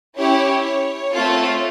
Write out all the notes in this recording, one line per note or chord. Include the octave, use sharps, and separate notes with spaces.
C#4 E4 G4 C#5
C#5
A3 C4 F4 A4